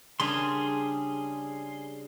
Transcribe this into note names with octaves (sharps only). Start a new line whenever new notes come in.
C#3 G3 D4 G#4 C6